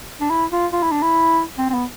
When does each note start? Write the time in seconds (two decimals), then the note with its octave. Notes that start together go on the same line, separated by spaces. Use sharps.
0.21 D4
0.30 E4
0.52 F4
0.72 F4
0.83 E4
0.92 D4
1.02 E4
1.58 C4
1.70 C4
1.74 B3